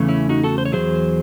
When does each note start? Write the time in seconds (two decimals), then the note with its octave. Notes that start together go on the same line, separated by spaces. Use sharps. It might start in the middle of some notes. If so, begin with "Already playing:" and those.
Already playing: E2 C#3 E3 A3
0.08 C#4 E4
0.29 D#4 F#4
0.44 F#4 A4
0.58 C5
0.65 C#5
0.72 E2 C#3 F#3 G#4 C5